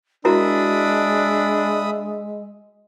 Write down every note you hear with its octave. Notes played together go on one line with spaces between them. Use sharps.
G#3 D4 E4 F#4 A#4 E5 B5 D#6